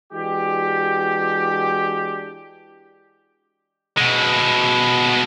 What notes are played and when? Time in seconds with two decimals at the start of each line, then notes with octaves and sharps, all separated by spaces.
0.12 E3 G#3 D4 F#4 G4
3.97 B2 G#3